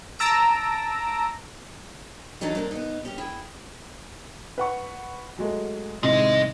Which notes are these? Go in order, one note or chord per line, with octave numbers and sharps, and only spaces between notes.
A5 A#5 E6 A#6 D7
E3 F#3 D4 D#4 A4
A#3 C4 D4
B3 D#4
C#4 G4
E4 G#4 G5
B4 F#5 C#6
F#3 G#3 A3
A2 C3 D#3 G#3 D#5